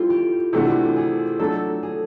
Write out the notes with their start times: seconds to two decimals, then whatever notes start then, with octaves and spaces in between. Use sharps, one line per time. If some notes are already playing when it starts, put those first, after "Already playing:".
Already playing: G3 C4 E4 F4 A4
0.10 G4
0.53 C3 E3 A3 D4 F#4
0.96 G#4
1.39 F#3 A3 D4 A4
1.83 G#4